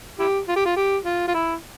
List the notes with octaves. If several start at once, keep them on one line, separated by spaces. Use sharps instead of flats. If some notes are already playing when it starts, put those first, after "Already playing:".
E4 G4
F4
G4
F4
G4
F4
F4
E4